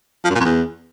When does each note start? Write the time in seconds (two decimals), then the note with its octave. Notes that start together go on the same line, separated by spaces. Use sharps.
0.25 F3
0.30 F#2
0.35 A#2
0.40 F2
0.45 E2